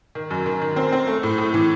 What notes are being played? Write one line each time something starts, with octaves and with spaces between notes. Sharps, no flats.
D#3
F#2
D#3
D#3
C4
C4
A3
A2
A2
E3